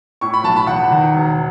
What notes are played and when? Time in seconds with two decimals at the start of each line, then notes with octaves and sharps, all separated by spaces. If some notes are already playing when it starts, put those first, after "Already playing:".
0.21 A2 C#6
0.34 B5
0.44 B1 A5
0.56 B5
0.67 E2 F#5
0.91 D#3
1.14 E1